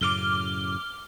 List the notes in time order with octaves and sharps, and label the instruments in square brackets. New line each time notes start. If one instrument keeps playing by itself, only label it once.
[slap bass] F#2 A2 C#3 [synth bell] D6 F6 G7